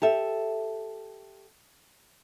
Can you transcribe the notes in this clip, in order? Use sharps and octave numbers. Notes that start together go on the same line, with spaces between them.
G4 A4 E5